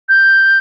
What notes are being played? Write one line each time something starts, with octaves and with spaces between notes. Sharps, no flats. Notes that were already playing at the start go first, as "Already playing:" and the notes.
G6